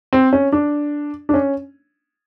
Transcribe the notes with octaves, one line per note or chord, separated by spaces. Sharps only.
C4
C#4
D4
D4
C#4